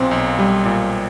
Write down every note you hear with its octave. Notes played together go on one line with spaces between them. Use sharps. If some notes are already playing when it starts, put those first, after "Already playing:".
Already playing: B1 A#2 C4
B1
G3
A#2